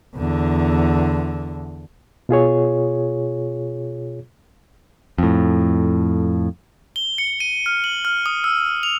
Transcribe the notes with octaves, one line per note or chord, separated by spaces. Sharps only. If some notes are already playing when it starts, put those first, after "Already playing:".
E2 D3
B2 F4 G#4 C#5
F2 A2
G7
C#7
D#7
F6
F#7
F6
D#6
E6
F7